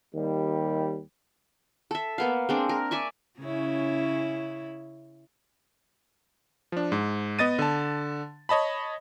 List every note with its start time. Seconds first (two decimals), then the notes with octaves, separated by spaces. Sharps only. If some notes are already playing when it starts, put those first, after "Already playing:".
0.15 D#2 D#3 G3
1.91 A4 E5
2.18 A#3 B3 F5
2.49 G#3 C4 D4
2.69 A#4
2.91 D5 E5 G#5 C#6
3.39 C#3 C#4 E4
6.72 F3 D4
6.92 G#2
7.39 B3 D#5 A6 D#7
7.59 D3 A5
8.49 C#5 D#5 A5 B5